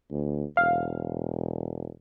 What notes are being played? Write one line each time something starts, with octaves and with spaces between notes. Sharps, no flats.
D2
E1 F5